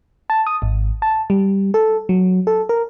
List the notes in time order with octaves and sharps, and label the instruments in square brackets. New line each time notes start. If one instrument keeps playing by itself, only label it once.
[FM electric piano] A5
D#6
G#1
A5
G3
A4
F#3
A4
A#4